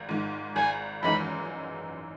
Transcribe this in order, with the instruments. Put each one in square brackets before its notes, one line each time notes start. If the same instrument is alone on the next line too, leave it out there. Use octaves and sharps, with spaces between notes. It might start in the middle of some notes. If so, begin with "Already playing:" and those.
Already playing: [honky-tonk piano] G#1
G#2 D#3
[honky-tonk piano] G#1 [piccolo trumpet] G#5
[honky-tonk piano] F#2 E3 G#3 D#4 [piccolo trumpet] B5